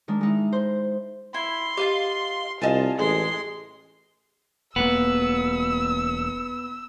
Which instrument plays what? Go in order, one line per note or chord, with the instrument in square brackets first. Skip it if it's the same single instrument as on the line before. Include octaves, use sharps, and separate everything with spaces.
[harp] D#3 G#3 D4
G#3 D#4 E4
C5
[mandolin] E4 [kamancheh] C6
[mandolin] F4 D#5 F5 [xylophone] G4
[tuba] C2 [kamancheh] F4 [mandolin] D#5 G#5 A5
[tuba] A1 [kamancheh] G#3 C6 [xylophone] G#4
[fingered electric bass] E1 A#3 [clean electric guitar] B3 [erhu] E6